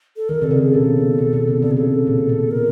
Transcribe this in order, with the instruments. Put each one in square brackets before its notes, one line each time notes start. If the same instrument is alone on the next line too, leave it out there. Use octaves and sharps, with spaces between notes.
[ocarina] A4
[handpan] D#3 [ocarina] A#4
[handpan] C3 [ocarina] A4
[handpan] C#3
[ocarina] G#4
[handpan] B2 [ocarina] A4
[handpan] B2
B2
C3
[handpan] C#3 [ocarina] A4
[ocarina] G#4
[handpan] C3 [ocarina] A4
[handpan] A#2
A#2
[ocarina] A#4